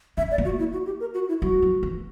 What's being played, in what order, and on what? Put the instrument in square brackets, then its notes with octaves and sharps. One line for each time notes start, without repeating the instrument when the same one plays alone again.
[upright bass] C#4 [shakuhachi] E5
[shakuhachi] D5
[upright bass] A#3
[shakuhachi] F#4
E4
F#4
G4
A#4
F#4
E4
[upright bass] G3 [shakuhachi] F#4
[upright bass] F#3
E3